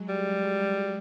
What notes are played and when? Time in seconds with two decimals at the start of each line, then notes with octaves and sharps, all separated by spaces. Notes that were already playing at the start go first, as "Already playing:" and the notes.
Already playing: F#3 G#3
0.09 G3